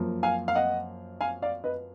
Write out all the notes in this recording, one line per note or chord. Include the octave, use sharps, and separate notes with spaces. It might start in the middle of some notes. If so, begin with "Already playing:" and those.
Already playing: F#2 F3 A#3
F5 G#5
F5
D#5 F#5
F5 G#5
D5 F5
B4 D#5